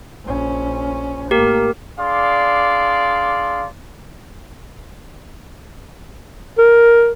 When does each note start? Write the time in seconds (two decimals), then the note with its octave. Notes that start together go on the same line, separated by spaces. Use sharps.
0.25 A#1 C#4
1.31 A2 A#3 G4 A#4
1.99 D4 G#4 D5 F5 C6
6.58 A#4